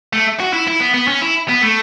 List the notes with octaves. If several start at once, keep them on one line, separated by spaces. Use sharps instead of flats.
A3
F#4
E4
E4
B3
B3
C#4
E4
B3
A3